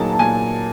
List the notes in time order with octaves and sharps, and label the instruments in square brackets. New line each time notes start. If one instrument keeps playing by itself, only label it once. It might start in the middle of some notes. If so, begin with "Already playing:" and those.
Already playing: [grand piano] A#2 F#3 A#3 D#4 G#4 [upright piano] A5
[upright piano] A5
[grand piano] A#2 [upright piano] G#5